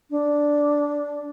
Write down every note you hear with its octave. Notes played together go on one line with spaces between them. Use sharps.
D4